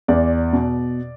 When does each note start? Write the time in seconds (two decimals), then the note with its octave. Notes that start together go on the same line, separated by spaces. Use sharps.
0.08 E2 D5
0.53 B2